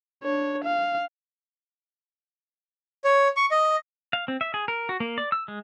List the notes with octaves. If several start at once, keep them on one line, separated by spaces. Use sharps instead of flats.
D4 C#5
F5
C#5
C#6
D#5
F5
C4
E5
G#4
A#4
F#4
A#3
D5
E6
G#3